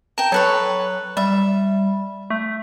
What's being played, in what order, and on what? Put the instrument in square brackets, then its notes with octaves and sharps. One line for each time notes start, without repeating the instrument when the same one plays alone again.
[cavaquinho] A#4 G5 [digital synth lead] A5
[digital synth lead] F#3 [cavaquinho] A4 B4 C#5
[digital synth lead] G3 [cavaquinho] E5
[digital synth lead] A3